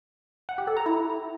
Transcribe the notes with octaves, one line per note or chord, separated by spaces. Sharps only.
F#5
G4
A4
A#5
E4